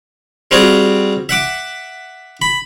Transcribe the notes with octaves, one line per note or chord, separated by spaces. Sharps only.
G3 C4 F4 F#4 G#4
E5 F#5 D6
B5